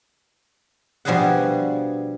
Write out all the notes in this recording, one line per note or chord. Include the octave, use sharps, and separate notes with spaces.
B2 F3 G3 D4 G#4 F#5